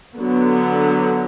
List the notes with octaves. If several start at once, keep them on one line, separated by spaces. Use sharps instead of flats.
D3 F#3 B3